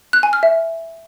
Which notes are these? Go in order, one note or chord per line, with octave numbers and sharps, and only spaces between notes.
F#6
G#5
F6
E5